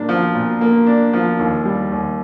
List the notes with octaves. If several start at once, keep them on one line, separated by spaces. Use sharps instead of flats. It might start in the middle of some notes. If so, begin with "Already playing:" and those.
Already playing: A#2 A#3 D4
F3
A#2
A#3
D4
F3
D#2
G3
D#2